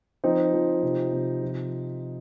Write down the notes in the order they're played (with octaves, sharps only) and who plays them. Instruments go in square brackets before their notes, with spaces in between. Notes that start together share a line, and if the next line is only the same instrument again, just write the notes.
[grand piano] F3 C4 D#4
F3
C3
C3
F3